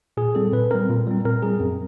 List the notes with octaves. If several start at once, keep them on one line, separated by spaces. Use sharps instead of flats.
A#2 G#4
G3 C4 A4
A#2 B4
G3 C4 A#4
A#2
G3 C4
A#2 A#4
G3 C4 G#4
F#2